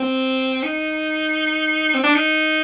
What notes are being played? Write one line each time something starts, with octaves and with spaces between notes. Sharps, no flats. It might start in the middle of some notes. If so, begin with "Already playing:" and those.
Already playing: C4
D#4
C4
D4
D#4